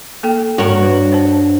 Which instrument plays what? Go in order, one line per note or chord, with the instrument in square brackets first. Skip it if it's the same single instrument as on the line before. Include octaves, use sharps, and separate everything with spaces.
[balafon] A#3 A4 G5
[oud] G2 A#4 [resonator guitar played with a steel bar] F#4 C#5
[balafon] B4
C5 A5